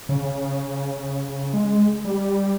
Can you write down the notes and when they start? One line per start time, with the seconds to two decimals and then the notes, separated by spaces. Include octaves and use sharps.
0.09 C#3
1.53 G#3
2.05 G3